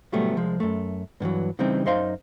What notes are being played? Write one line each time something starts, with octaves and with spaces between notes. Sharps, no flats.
C2 A2 F#3 G3 A3 B3
C2 F3 G#3
F#2 A3
G2 D3 E3 F#3
C#3 E3 G3 C4 D#4
F#2 D#4 C5 D#5 F5 C6